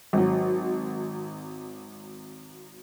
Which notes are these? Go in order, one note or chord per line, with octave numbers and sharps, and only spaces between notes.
G#1 F#3